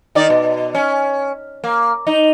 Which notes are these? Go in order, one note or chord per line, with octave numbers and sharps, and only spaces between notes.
D#3 D#4 D5
B2
C#4
A#3
D#4